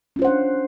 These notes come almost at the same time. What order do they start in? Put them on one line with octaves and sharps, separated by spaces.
C#4 F4 C5 F#5 D4